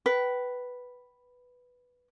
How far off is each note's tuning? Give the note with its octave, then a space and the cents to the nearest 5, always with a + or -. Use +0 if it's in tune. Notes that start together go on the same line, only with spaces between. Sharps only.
B4 +0 G5 -35